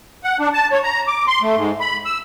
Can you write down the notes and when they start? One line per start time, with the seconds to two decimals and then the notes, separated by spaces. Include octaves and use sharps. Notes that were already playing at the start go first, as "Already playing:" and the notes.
0.24 F#5
0.39 D4
0.53 A5
0.72 C#5
0.84 A#5
1.07 D6
1.28 C6
1.42 A3
1.56 G#2
1.80 B5
2.05 E6